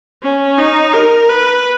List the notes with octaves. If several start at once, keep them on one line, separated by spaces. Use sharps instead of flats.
C#4
D#4
A#4
B4